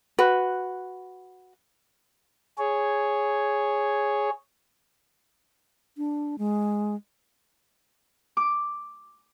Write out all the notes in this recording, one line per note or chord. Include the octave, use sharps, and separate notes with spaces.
F#4 B4
G#4 C#5
D4
G#3
D6